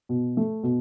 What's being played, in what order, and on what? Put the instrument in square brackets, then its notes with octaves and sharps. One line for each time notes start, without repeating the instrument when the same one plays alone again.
[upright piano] B2
A3
B2